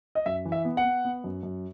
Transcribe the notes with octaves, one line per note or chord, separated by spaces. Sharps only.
D#5
F#2 E5
E3
E5
B3
F#5
B3
B3
F#2
F#2